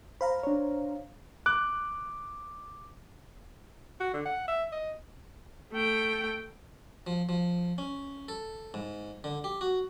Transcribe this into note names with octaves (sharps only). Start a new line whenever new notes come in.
C5 F5 A#5 B5
D4 C#5
D6 F#6
F#4
D3
F#5
E5
D#5
A3 G5
F3
F3
C#4
A4
G#2
D3
G4
F#4